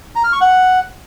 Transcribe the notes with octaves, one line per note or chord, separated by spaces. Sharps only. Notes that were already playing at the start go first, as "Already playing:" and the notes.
A#5
F6
C#6
F#5